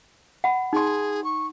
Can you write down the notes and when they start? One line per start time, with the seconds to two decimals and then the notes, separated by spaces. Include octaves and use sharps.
0.44 F#5 B5
0.73 D#4 G#4 C6
1.24 C#6